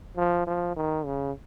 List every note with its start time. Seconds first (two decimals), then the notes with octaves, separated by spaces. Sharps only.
0.17 F3
0.47 F3
0.76 D#3
1.05 C#3